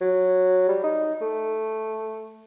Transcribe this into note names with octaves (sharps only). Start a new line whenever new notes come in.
F#3
G3
D#4
A3